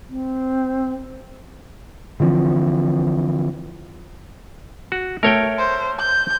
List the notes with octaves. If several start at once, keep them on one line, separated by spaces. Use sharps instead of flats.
C4
D3 E3 F3 C4
F#4
A3 A#4 C#5 G5
C5
G6